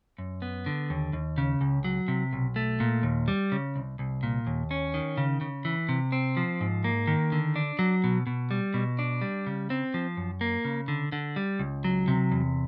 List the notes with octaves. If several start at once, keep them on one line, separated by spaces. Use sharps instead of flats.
F#2
B3
D3
D#2
D#2
C#3
C#2
F#3
C3
B1
A3
A#2
D#2
G3
C#3
C2
C2
A#2
D#2
C#4
D#3
C#3
C#3
E3
C3
C4
F3
G#2
A#3
D#3
D3
D4
F#3
B2
B2
G3
B2
D4
G3
C#3
C4
F3
F#2
A#3
C#3
D3
D3
G3
C#2
F#3
C3
E2